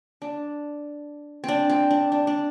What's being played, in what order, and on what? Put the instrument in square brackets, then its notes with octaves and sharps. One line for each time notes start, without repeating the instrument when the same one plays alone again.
[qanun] D4
C4 D4
C4
D4
D4
D4